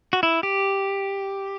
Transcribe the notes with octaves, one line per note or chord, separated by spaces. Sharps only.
F#4
E4
G4